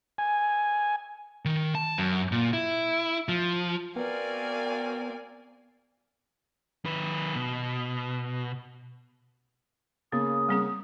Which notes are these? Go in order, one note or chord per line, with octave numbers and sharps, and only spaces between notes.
G#5
D#3
A5
F#2
A#2
E4
F3
B3 C4 F#4 A#4 D5 F5 G#5
D#3 B4
B2
C#3 A#3 B3 D#6
G3 C4 G#4